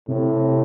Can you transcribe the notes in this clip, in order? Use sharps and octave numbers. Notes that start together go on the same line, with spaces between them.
A2 C3